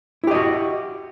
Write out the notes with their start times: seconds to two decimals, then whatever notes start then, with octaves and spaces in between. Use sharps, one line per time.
0.24 E4
0.27 G4
0.31 D#5
0.35 F#4